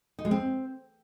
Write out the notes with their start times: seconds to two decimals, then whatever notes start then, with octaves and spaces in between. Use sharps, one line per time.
0.19 D#4
0.25 G#3
0.31 C4